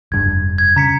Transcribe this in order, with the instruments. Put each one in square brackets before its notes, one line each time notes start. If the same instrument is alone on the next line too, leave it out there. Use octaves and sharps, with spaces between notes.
[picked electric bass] F1 G2 [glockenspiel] G#6
[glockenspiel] G#6
[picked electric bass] C#3 [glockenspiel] A#5 B6 C#7